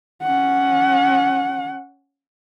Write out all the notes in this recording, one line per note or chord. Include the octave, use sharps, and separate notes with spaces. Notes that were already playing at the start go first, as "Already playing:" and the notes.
C#4 F#5